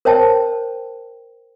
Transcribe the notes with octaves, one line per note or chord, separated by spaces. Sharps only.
A#4 C5 C#5 E5 G5 A5